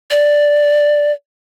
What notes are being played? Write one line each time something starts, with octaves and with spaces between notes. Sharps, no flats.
D5